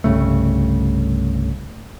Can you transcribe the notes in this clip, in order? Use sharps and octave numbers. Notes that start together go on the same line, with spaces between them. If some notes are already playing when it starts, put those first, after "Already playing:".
C2 G2 C#3 A3